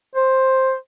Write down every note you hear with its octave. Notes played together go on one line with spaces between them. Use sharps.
C5